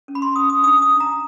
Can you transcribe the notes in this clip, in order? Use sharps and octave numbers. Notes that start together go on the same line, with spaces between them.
C#4
B5
C6
C#4 D#6
D#6
D4 D#6
D#6
D4
A#5